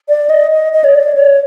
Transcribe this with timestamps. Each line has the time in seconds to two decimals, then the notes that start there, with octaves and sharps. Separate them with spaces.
0.09 D5
0.30 D#5
0.51 D#5
0.73 D#5
0.84 C#5
0.95 D5
1.15 C#5